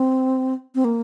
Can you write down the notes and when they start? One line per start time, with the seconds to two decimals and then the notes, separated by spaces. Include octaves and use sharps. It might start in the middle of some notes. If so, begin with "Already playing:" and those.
Already playing: C4
0.75 C4
0.85 A#3